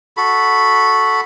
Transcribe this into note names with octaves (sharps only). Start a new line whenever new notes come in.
F#4 A4 B5